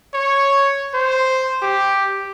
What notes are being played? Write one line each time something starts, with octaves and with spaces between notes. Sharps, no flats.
C#5
C5
G4